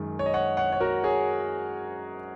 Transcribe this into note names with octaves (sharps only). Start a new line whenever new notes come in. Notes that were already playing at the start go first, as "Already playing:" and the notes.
Already playing: F#2 D#3 G#3
C#5
D#5
C#5 F#5
C#5 F#5
C#5
F#4 A#4
G#4 C#5